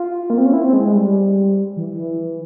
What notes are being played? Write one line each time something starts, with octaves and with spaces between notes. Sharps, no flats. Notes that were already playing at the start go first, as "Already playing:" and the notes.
Already playing: F4
A#3
C4
C#4
E4
C4
G#3
G#3
G3
E3
E3